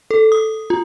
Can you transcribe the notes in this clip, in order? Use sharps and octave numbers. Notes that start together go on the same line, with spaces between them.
A4
D#6
F4